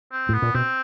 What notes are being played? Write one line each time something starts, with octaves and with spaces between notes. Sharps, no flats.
C4
A2 B3
A#2
B2 C4